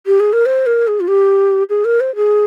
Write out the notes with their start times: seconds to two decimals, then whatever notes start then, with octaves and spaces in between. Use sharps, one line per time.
0.06 G4
0.20 G#4
0.33 A#4
0.46 C5
0.66 A#4
0.87 G#4
1.00 F4
1.08 G4
1.69 G#4
1.85 A#4
2.00 C5
2.16 G#4